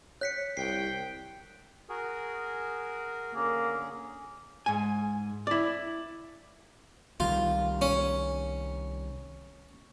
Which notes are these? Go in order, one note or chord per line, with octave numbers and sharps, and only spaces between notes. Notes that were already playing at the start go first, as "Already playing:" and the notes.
C#5 F#6 B6 C#7
C2 G5 C7
F#4 G#4 A#4
D3 A#3 C#4 G#4
G#2 G#5
E4 D5
C2 D#3 G3 F4
C#4